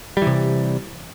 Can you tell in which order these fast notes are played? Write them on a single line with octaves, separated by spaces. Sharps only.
G3 E3 C3